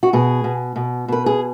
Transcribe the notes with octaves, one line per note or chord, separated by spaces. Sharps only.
F#4
B2 G#4
B2
B2
B2 B4
G#4